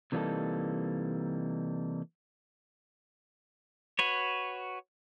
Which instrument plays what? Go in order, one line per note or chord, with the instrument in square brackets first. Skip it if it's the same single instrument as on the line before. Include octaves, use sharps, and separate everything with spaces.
[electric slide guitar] C3 E3 G3 A#3 D#4 A4
[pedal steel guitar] F#4 B4 C#5